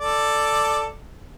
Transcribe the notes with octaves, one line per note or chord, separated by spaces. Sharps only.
A4 D5